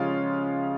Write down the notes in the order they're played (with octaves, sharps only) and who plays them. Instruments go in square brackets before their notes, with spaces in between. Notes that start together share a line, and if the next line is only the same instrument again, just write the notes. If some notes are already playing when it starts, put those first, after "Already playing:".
Already playing: [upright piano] C#3 F3 G#3 C#4 F4 F5